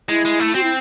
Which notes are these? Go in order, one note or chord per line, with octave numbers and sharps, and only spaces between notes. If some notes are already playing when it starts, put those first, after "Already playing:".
G#3 E4
G#3
A3
C4 F#4
E4